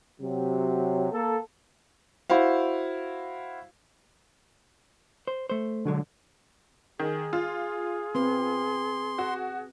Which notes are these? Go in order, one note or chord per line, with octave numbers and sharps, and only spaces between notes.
C3 F#3
A#3 A4
E4 F#4 C5 F5
C5
A3 C5
B1 D3 F#3 G#3
D#3 G#4
F4
C4 B4 C6
F#4